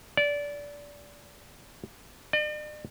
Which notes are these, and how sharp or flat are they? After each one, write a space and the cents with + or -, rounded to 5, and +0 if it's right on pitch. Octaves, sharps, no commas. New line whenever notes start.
D5 -20
D5 +45